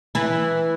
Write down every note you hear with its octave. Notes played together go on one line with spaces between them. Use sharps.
E3 E4